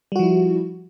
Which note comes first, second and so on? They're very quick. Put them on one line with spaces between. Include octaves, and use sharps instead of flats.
G3 F#4 F3 E4